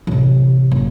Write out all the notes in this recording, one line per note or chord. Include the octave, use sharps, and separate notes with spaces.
A1 C3
F#1